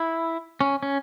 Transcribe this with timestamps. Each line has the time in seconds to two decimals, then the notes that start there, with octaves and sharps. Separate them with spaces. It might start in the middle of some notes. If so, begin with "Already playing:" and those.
Already playing: E4
0.61 C#4
0.83 C#4